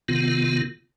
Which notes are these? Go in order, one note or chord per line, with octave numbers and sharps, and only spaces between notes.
C3 D#3 B3 F4